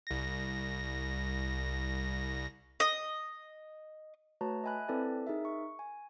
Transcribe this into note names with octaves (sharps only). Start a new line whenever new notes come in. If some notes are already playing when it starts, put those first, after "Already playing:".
C2 A#6
D#5
A3 F#4 B4 C#5 A5 A#5
D#5 E5 G#5 B5 F#6
C4 E4 A4 B4 D5 A5
D#4 G#4 A#4 E5
C#6
G#5